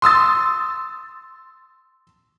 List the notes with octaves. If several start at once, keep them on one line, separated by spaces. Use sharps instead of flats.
C6 D#6 E6 A6